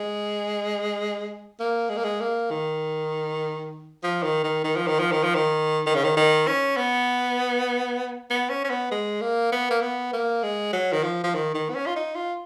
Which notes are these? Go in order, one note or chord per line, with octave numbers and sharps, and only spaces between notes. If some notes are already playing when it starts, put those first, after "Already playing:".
Already playing: G#3
A#3
G#3
A#3
G#3
A#3
D#3
F3
D#3
D#3
D#3
F3
D#3
F3
D#3
F3
D#3
D#3
C#3
D#3
D#3
C#4
B3
B3
C#4
C#4
B3
G#3
A#3
B3
A#3
B3
A#3
G#3
F#3
D#3
F3
F3
D#3
D#3
B3
C#4
F4
D#4
F4